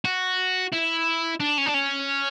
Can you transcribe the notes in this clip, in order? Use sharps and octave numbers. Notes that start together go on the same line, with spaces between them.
F#4
E4
D4
C#4
D4
C#4